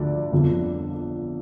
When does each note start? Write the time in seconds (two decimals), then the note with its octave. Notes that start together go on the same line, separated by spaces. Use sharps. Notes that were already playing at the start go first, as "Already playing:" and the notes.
Already playing: D2 D3 F3 D5
0.32 G1 F2 D3 F3